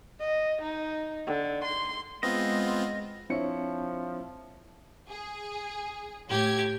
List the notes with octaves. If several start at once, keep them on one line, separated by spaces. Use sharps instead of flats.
D#5
D#4
D3
C6
G#3 B3 C4 F4 D#5
F3 C4 D4 E4 C#5 C#7
G#4
A2 G4 G#6